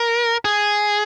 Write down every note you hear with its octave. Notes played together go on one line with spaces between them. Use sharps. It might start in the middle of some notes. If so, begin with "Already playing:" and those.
Already playing: A#4
G#4